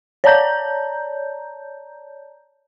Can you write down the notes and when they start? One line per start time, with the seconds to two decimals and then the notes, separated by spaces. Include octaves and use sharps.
0.24 C#5 D5 A5 A#5 G6